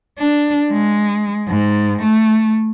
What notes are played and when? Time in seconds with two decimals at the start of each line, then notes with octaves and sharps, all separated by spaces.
0.19 D4
0.72 G#3
1.48 G#2
2.03 A3